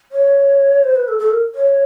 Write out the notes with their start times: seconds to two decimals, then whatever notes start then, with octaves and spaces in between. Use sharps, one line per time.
0.12 C#5
0.84 C5
0.96 B4
1.08 A4
1.19 A4
1.31 A#4
1.55 C#5